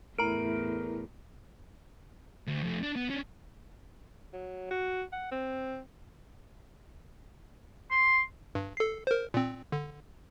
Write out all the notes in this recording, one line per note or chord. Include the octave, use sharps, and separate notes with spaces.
E2 A2 A3 E4 A#4 A#5 D7
D2
F2 A3
D4
B3
C#4 D4
F#3
F#4
F#5
C4
C6
G2
A4 C7
A#4 C5
A#2 C4
D3